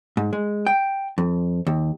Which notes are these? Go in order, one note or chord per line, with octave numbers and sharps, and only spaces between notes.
G#2
G#3
G5
F2
D#2